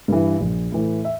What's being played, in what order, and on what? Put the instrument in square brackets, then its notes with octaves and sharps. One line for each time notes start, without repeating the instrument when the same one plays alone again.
[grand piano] G2 E3
A#1
A2 E3
E5